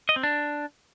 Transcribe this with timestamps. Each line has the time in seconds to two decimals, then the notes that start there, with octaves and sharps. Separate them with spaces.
0.09 D#5
0.16 C4
0.23 D4